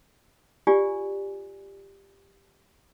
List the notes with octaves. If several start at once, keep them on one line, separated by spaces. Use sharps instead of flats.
F4 G4 D5 G#5